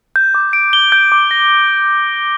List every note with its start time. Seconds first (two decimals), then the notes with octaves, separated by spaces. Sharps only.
0.16 G6
0.35 D6
0.53 D7
0.73 G7
0.92 G6
1.12 D6
1.31 A#6